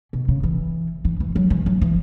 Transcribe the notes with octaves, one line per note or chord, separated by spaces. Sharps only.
B2
C#3
E3
E3
E3
F#3
E3
F#3
E3